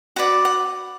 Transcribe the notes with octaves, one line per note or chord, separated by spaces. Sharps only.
F#4 B4 D5 F#5
F#5